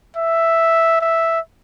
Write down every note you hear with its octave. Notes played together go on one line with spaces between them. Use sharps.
E5
E5